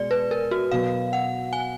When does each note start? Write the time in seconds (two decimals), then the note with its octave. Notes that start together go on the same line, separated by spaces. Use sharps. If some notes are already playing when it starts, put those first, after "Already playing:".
Already playing: B2 G#3 D5
0.11 B4
0.31 A#4
0.51 F#4
0.71 B2 F#3 B3 F5
1.13 F#5
1.53 G#5